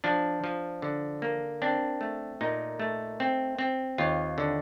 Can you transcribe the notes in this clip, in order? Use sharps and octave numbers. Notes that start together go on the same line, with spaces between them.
F3 D4
F3
D3
A#3
C4 D4
A3
A#2 D#4
A3
C4
C4
D#2 F4
D3